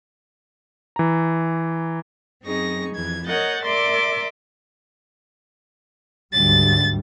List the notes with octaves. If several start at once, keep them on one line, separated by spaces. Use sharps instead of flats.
E3 A#5
F#2 C4 D#4 G#4 C#6 A#6
F2 E3 G#6
A#4 C#5 D#5 F#5 G6 A6
A#4 D5 E5 C6 D6
D2 G#2 G3 A6